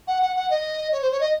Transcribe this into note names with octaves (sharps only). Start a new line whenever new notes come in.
F#5
F#5
F#5
D#5
C#5
C5
C#5
D#5